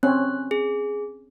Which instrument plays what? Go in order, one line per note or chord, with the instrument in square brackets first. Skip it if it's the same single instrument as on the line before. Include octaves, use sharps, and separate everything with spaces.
[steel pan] C4 C#4 [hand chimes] F#6
[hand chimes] G#4